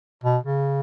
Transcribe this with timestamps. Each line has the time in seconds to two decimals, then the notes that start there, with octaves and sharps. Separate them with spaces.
0.24 B2
0.43 C#3